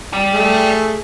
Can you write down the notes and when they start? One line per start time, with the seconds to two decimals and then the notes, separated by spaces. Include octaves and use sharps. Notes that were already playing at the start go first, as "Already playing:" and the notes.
0.13 G4 D5
0.33 A3 G#4